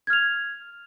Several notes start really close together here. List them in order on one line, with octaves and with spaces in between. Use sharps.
G#6 F6 F7